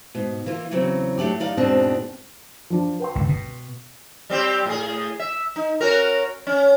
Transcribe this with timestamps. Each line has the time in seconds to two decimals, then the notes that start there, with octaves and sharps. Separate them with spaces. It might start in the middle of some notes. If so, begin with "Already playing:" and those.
0.15 G#2 B2
0.46 E3 A#3 F4
0.71 E2 C#3 F#3 C4
1.18 F#3 A3 C#4 D4 G4
1.40 F#2 D#4 D5 F5
1.57 E2 G#2 B2 G#3 C4 D4
2.70 F3 D4
3.00 B4 G5 C6
3.15 G1 C#2 D3
3.29 B2
4.30 G3 C4 G4
4.66 A2 G#4
5.20 E5
5.56 D#4
5.81 C#4 F#4 A#4
6.47 C#4